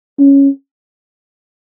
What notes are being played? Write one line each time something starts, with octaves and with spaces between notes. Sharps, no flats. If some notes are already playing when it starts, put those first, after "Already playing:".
C#4